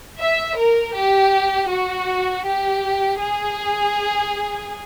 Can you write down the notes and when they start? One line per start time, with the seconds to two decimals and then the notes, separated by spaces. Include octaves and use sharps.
0.19 E5
0.57 A#4
0.94 G4
1.69 F#4
2.45 G4
3.20 G#4